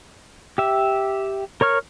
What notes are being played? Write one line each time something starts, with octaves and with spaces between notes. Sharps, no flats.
G4 E5
A#4 C#5 C#6 F6